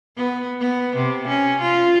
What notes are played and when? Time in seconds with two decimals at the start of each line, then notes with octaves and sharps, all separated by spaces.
0.17 B3
0.60 B3
0.96 C3
1.28 C#4
1.61 F4